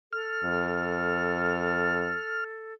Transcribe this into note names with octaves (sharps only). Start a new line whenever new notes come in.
A4 F6
F2